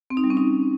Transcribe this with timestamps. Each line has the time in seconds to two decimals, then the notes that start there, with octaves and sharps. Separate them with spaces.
0.10 C4
0.17 D#4
0.24 G3
0.30 C#4
0.37 D#4